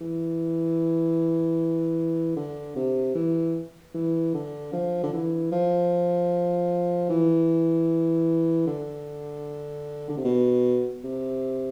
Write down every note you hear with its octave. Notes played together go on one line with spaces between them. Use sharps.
E3
D3
C3
E3
E3
D3
F3
D3
E3
F3
E3
D3
D3
C3
B2
C3